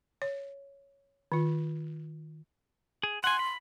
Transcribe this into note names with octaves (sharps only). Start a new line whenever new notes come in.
C#5
D#3 F4
G#4
F#5 G#5 C6
B5